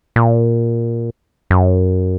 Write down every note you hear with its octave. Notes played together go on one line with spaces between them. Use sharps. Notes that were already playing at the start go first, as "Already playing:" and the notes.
A#2
F#2